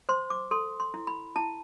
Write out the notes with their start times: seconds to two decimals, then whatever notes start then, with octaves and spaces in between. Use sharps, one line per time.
0.09 C5 C6
0.30 D6
0.51 A4 C6
0.80 C6
0.94 E4
1.07 B5
1.36 E4 A5